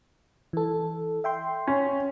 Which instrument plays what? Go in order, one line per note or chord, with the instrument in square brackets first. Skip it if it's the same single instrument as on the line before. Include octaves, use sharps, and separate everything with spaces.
[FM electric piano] E3 A4
E5 G5 C6
[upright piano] C#4